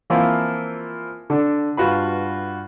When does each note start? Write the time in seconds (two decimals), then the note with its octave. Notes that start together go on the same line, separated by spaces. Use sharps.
0.10 E3 F3 A#3 C4 E4 F4
1.30 D3 D4
1.77 G2 F4 F#4 B4 B5